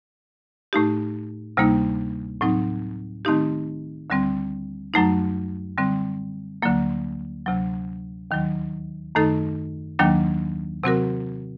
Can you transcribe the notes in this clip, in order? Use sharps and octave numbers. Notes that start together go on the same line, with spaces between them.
A2 A3 D#4 G4
D2 C3 G3 A#3 D#4
A2 F#3 C4 D#4
D#3 A3 C4 D#4 G4
D2 D3 G3 C4
F#2 F#3 A3 D#4
D3 G3 C4
D2 D3 F#3 A#3
D2 C3 F#3
D#2 D#3 F#3
F#2 D#3 A3 D#4 A4
D#2 D#3 F#3 A#3 D4
C3 F#3 C4 F#4 A#4